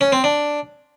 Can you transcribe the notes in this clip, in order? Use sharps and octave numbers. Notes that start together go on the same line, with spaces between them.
C#4
C4
D4